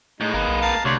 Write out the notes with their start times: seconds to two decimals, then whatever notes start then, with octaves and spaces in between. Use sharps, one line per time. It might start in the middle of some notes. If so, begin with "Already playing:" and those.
0.20 A2 G#3 D#4
0.34 G1 A#3 B4
0.48 B1
0.61 F5 A5 A#5
0.85 D2 C3 C#5 D5 C6